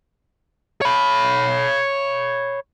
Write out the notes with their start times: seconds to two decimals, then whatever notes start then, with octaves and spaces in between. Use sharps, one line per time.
0.81 C#5 B5